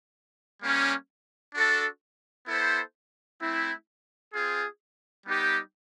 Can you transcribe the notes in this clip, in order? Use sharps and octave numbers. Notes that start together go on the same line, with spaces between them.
G3 A#3 C#4
D4 F#4 A4
B3 E4 A4 C5
A3 C4 E4
C4 F4 G#4
G3 B3 D#4 G4